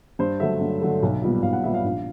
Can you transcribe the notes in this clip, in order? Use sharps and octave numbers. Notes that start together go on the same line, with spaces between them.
G2 C5
D3 F#3 A3 E5
G2
D3 F#3 A3
B1
A#2 G3 B3
B1 F5
F#5
A#2 G3 B3 E5
F5
A#1